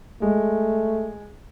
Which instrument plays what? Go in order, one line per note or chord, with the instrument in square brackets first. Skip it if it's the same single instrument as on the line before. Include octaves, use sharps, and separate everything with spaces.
[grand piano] G#3 [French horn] A3